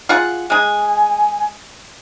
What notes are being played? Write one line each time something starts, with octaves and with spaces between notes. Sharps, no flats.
F4 G#4 F#5
G#3 G#4 G#5